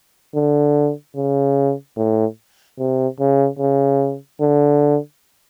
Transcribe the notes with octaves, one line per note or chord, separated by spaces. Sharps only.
D3
C#3
A2
C3
C#3
C#3
D3